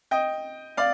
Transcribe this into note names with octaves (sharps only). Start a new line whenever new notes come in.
D#5 G5
D5 F5